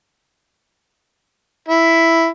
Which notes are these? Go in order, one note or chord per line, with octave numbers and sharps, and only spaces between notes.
E4